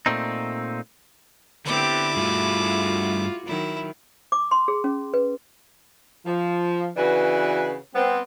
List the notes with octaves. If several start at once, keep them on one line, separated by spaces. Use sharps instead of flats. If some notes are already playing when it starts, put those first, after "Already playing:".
A#2 A3 C4 D#4
D3 B3 C4 E4 G4 D6
G2 A3 F4 F#4 G#4
D#3 F#3 E4
D6
C6
G#4
C#4
B4
F3
C#3 E3 D4 F#4 B4
G3 B3 C4